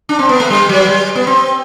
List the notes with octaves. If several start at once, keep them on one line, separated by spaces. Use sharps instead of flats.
D4
C4
B3
A3
G3
F#3
G3
B3
C4